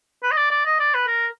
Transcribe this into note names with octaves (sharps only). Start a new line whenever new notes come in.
B4
D#5
D5
D5
D#5
D5
B4
A#4